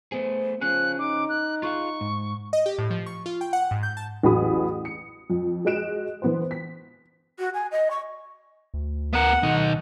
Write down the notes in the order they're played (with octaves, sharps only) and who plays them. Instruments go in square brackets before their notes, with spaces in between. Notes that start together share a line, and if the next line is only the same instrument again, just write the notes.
[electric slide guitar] A3 B3 G#4 [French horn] C5
[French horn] F3 [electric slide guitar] C#4 G#4 [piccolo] F#6
[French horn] D#4 [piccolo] D6
[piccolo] F#6
[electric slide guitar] F4 G#4 F5 [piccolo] C#6
[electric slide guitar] G#2
[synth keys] D#5
G4
A2
F3
C#6
F4
G5
F#5
G#2
G6
A5
[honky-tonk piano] A1 E2 F#3 G#4 B5 D#6
C#7
F2
G#3 F#4 D#5 F#6 D7 E7
E3 B3 C5
B6
[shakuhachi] F#4
G#5
D#5
C#6
[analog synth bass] D2
[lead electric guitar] B3 A#4 [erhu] F#5
[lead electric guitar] B1 D#4 [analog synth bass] D#3